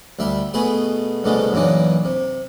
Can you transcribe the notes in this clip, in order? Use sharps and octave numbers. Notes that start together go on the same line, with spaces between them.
D2 G3 E5 C6
B2 A3 G#4 B4 C6
C2 B2 D3 G#3 A3 A4
F#2 A#2 E3 D4 D#4
C3